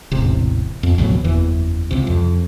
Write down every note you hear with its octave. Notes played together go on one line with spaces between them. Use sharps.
E1 A1 C3
F2
A1 D2 B2 F#3
F#1 E2 E3
C#2 C3
F2